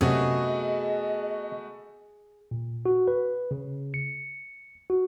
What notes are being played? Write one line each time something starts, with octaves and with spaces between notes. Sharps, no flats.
F#2 C3 A3 B3 F#4 G#4 D#5
A#2
F#4
B4
C#3
C#7
F#4